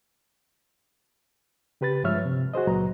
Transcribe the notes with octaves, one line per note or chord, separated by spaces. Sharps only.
C#3 G4 B4 B5 A6
G2 F3 G#3 C#5 E5 F6
C3
F#4 G#4 C5 D#5
C#2 A#2 F#3 B4 A#5